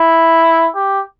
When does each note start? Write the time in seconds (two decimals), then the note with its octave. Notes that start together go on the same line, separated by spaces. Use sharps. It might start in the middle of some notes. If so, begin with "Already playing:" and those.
Already playing: E4
0.75 G4